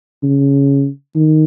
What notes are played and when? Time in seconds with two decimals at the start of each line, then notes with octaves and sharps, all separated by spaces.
0.24 C#3
1.15 D#3